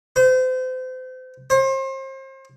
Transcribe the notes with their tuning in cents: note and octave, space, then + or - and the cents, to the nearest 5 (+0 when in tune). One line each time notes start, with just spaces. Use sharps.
C5 -35
C5 +35